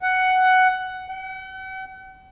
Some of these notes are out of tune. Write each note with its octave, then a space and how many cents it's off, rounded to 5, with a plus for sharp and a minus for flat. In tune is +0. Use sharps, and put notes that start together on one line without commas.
F#5 +10
F#5 +45